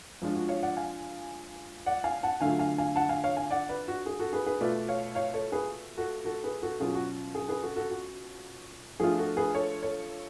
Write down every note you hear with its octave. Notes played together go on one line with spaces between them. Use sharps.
F3 G#3 D4 F4
F#4
C#5 F5
D5 F#5
F5 G#5
D5 F#5
F5 G#5
F#5 A5
D3 F#3 A3 F4 F5 G#5
F5 G#5
F5 G#5
F#5 A5
F5 G#5
C#5 F5
F5 G#5
D5 F#5
B4 D5
F#4
G#4
F#4 A4
G#4 B4
G#4 B4
B2 A3 F4 B4 D5
C#5 F5
C#5 F5
A4 C#5
G#4 B4
F#4 A4
F#4 A4
G#4 B4
F#4 A4
B2 F#3 C#4 F4 G#4
F#4
G#4
G#4 B4
F#4 A4
F#4 A4
F#4
F3 A3 D4 F4 G#4
F#4 A4
G#4 B4
A4 C#5
A4 C#5